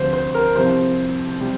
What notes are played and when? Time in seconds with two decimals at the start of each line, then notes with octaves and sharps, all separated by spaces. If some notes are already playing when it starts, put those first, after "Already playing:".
Already playing: D2 C3 F3 C5
0.13 C5
0.35 A#4
0.55 C2 C3 F3 C5
1.41 C3 G3